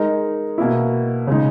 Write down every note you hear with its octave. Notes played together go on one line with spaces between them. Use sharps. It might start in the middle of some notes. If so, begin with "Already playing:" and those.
Already playing: G#3 D#4 A#4 D#5
B2 A#3 E4
C#3 G#3 D#4